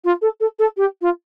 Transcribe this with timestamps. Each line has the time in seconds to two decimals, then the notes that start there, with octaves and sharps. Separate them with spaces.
0.04 F4
0.21 A4
0.40 A4
0.59 A4
0.77 G4
1.01 F4